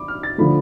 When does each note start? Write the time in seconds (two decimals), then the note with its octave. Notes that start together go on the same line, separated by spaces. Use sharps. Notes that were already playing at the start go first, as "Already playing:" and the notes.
Already playing: B5 D6
0.08 F6
0.23 A6
0.38 D3 F3 A3 B5